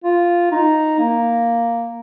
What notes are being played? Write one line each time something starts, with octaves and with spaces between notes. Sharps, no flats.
F4
D#4
A#3